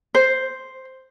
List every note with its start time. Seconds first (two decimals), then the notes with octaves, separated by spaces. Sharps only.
0.15 C5